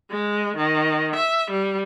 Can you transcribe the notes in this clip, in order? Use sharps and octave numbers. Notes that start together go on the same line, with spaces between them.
G#3
D#3
E5
G3